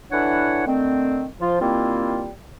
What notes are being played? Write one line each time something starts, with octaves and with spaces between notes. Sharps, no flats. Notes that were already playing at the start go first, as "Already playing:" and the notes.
D3 E3 D4 E4 C#5 F#5
D3 D#3 A3 C4
F3 F4
D#3 G3 A#3 C4 E4 F4